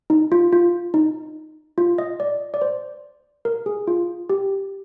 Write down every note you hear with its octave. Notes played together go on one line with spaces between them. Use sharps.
D#4
F4
F4
D#4
F4
D#5
D5
D5
C5
A#4
G#4
F4
G4